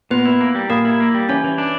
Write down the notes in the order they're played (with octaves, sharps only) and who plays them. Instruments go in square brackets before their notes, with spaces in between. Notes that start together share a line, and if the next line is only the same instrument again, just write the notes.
[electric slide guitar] A#2 [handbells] B3 B4
[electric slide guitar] E4
A#3
G3
[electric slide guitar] A#2 [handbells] A#3 A#4
[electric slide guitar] E4
A#3
G3
[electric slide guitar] E3 [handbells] C#4 C#5
[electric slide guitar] E3
D4